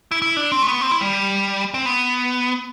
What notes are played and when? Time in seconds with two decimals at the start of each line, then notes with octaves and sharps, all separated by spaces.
0.12 E4
0.22 E4
0.37 D4
0.52 C4
0.62 A3
0.67 B3
0.81 C4
0.91 E4
1.01 G3
1.74 C4
1.86 B3